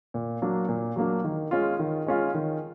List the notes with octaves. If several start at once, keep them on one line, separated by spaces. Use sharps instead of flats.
A#2
F#3 A#3 D4
A#2
F#3 A#3 D4
D#3
G#3 C#4 F4
D#3
G#3 C#4 F4
D#3